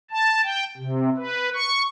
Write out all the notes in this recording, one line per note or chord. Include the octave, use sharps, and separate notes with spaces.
A5
G5
C3
B4
C#6